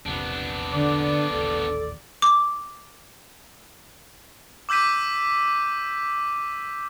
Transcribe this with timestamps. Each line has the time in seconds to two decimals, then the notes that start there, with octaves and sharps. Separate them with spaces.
0.06 E1 A#1 C3 B3 D4
0.73 D3 D5
1.31 D#1 A1 A4
2.22 D6
4.69 D6 E6 G6 B6 D#7